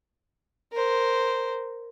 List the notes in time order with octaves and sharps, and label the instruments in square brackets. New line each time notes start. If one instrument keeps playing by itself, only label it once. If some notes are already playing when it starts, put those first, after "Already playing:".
[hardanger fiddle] A#4 C5